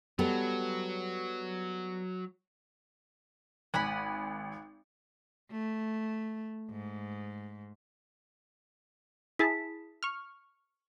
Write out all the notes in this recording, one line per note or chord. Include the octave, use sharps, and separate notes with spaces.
F#3 G3 B3 A4
G#1 F#5 G#5 B5
A3
G#2
E4 G#4 A5 B6
C#6 F6